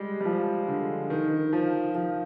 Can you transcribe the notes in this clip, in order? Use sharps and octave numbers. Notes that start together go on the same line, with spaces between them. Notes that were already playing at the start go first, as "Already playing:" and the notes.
Already playing: G3 G#3
G3
F3
D3
D#3
F3
F3